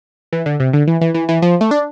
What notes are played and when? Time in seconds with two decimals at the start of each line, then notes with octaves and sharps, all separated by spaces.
0.33 E3
0.46 D3
0.60 C3
0.73 D3
0.87 E3
1.01 E3
1.14 E3
1.29 E3
1.42 F3
1.61 A3
1.71 D4